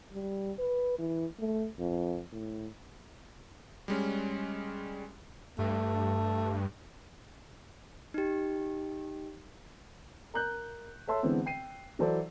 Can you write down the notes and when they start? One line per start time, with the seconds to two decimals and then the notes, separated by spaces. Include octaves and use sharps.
0.13 G3
0.59 B4
0.99 E3
1.39 A3
1.79 F2
2.32 A2
3.88 G3 G#3 C#4
5.58 G2 A3
8.14 D#4 G4
10.34 A#4 A#5 F#6 G6
11.07 A4 C#5 E5 A5 C6 E6
11.23 D3 E3 G#3 B3 C4
11.46 G5 C7 D#7
11.99 E3 F#3 E4 A4 C5 D5